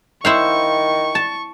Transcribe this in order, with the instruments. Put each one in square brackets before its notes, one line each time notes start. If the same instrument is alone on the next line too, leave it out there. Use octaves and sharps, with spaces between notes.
[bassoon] D#3 [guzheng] E4 C5 F5 [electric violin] C#6
[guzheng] A5